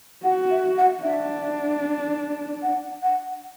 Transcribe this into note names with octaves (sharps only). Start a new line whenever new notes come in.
F#4 F#5
E5
F#5
D4 E5
F#5
F#5